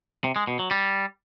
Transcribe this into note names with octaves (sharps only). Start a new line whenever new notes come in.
C3
G#3
B2
F#3
G3